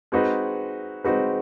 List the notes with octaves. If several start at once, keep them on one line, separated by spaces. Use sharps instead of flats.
G#3 C4 D#4 F#4 B4
G#3 C4 D#4 F#4 B4